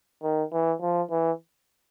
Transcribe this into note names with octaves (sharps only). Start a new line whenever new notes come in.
D#3
E3
F3
E3